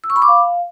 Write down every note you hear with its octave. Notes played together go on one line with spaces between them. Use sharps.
E6
C#6
B5
D6
F5